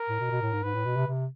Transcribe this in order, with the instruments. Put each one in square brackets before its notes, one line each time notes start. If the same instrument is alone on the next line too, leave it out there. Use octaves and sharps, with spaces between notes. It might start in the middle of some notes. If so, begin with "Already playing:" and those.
Already playing: [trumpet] A#4
[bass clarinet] A2
B2
B2
A2
G#2
[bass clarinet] G#2 [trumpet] B4
[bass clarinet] A2
B2
C3
C3